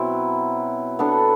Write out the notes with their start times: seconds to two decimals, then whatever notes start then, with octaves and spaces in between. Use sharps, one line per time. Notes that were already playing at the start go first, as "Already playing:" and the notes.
Already playing: B2 F#3 C4 E4
0.99 B3 D4 A4